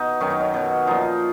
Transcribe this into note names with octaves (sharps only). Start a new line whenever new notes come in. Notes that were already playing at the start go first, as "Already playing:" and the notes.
Already playing: B2 D#4
F#2 D#3 F#3 C#4
D#4
C#4
B2 F#3
A#2 F3 D#4